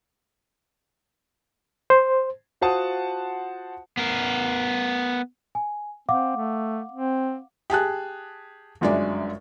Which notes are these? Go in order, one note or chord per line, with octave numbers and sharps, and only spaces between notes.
C5
F4 F#4 C5 F#5 A5 D#6
B3 A#4
G#5
C4 F5 F#5 D6
A3
C4
G4 G#4 A5 F#6
G1 F#2 G#3 D4 D5 E5